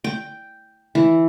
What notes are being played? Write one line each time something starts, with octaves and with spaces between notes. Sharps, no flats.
G5
E3